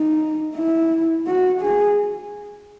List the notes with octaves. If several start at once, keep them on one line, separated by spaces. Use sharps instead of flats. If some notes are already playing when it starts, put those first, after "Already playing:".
Already playing: D#4
E4
F#4
G#4